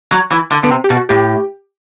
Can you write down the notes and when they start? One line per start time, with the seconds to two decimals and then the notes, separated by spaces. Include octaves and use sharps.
0.12 F#3
0.32 E3
0.52 D3
0.63 D3 B3
0.70 C3 C4
0.84 G4
0.90 B2
0.97 F#4
1.09 A2 G4